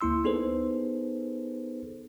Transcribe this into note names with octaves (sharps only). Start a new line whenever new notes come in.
D2 A#3 E4 C6 E6
B3 D#4 G#4 A4 B4 C5